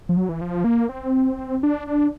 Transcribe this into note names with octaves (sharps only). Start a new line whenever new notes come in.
F3
F#3
E3
F3
A#3
C4
D4
D4